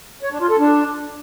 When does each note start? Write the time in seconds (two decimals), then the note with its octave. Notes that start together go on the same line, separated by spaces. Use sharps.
0.23 C#5
0.32 D4
0.41 F4
0.50 A4
0.59 D4